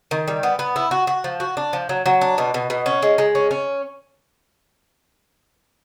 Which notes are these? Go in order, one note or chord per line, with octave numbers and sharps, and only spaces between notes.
D#3
G3
B3
B3
E4
F#4
F#4
F3
F#4
D4
F3
F#3
F#3
D4
B2
B2
B2
C#4
G#3
G#3
C#4
C#4